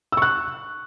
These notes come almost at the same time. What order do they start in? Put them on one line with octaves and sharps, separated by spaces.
E6 C#6 F#6